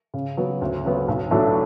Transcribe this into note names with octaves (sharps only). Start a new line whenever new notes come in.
C#3
F#3 B3
D2
C#3 F#3 B3
B1
A2 F#3 A3 D4